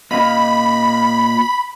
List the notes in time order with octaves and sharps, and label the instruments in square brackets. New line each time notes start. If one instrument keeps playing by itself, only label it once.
[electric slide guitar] A#2 D#5 F5 [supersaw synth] B5